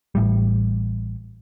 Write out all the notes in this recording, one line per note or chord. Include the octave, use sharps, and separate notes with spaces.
A1 A2 G3